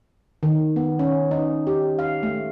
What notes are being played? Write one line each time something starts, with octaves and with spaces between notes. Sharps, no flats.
D#3
B3
C#4
D#4
G4
F5
A3